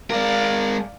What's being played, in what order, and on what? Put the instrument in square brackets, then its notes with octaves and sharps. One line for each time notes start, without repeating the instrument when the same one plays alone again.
[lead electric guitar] G#3 A#4 [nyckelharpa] D5 F5